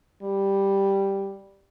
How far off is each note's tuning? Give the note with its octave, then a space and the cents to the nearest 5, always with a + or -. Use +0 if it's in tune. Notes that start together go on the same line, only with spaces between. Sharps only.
G3 +0